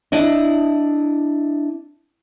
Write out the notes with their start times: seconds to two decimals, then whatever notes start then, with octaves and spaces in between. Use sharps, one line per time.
0.12 D4 E4 D#5